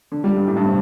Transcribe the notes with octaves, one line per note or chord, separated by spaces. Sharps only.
D3
G3
G2
A2
G2
C3